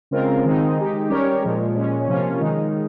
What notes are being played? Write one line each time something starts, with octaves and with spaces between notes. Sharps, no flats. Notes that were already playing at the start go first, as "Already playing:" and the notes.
C#3 G#3 C4 F4 A#4
D#3 G#3 C4 D#4
G#3 D#4 G4
G3 C#4 G4 A#4 C#5
A#2 F3 G#3
A#2 G#3 C#4
C3 F3 A#3 C#4 F4
D#3 G#3 D#4